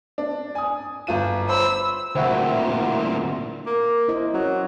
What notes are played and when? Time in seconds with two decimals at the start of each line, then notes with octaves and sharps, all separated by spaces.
0.18 D4
0.55 G#5 D#6
1.07 G1 F4 D#7
1.49 C5 B5 E6
2.15 D2 A#2 C4 E4 F#4
3.67 A#3
4.08 E4 C5 D#5
4.34 F#3 C#4